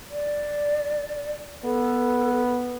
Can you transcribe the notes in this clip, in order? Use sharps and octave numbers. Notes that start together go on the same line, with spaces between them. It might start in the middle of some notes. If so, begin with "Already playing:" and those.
D5
B3 A4